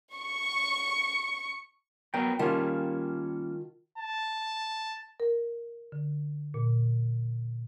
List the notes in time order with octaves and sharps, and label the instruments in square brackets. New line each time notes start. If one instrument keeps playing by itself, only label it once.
[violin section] C#6
[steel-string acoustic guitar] F#3 [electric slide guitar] B3 A#4 G5
[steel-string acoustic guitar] D#3 F4 A5 [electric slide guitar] G3 A#3 C#4
[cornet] A5
[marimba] A#4
D3
A#2